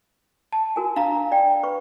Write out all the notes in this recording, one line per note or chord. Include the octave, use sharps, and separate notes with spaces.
A5
F#4 A#4 G#5
D4 F5 A#5
D5 G5
B4 B5 C#6